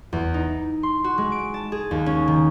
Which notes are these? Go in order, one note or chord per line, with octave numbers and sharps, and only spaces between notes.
E2
D#4
C6
F#4
G#3
D7
A5
G#4
D#2
C#4
D#3